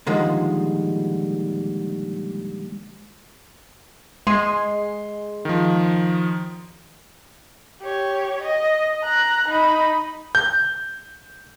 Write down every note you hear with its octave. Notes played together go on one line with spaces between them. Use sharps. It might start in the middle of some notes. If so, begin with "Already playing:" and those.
A#2 D3 D#3 F3 G3 G#3
G#3 C6
D#3 F3
G4 C#5
D#5
A#5 F#6
D#4 B5
G6